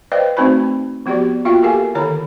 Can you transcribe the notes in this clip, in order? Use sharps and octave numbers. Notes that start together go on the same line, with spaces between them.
B4 C5 D5 D#5 F5 G5
A3 C4 D#4 F#4 C5 B5
F3 B3 F#4 G4 D5
A#3 F4 F#4 E5 F5 G5
G4 A4 A#4 F5 G#5
D3 D#3 E4 A4 C#5 A#5